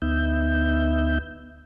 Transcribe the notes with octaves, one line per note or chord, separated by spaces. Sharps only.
D2 B3 D#4 E5 G6